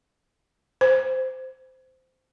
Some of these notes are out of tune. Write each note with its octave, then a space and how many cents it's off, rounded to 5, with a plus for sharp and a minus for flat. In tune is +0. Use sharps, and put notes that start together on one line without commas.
C5 -15